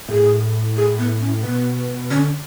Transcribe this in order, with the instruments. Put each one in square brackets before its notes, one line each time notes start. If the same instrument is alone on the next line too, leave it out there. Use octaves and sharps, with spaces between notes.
[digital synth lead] A2 [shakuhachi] G#4
[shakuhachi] G#4
B3
C#4
[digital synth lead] B2 [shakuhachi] B3
[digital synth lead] D3 [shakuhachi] C#4